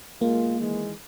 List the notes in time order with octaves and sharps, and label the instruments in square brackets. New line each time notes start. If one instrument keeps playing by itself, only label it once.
[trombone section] B1 G#3 F4 [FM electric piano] A#3
[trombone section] D#3 E3 G#3